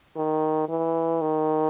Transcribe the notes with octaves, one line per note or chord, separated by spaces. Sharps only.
D#3
E3
D#3